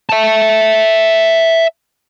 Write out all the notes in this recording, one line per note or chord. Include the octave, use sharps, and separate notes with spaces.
E5 A5